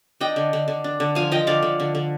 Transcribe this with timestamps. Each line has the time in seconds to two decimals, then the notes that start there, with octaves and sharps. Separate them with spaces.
0.21 D4 D#5 G5
0.36 D3
0.53 D3
0.68 D3
0.84 D4
1.00 D3
1.15 F3 F5 G#5
1.32 F3 D#5 G5
1.47 D3 D5 F5
1.63 D3
1.80 D3
1.95 D3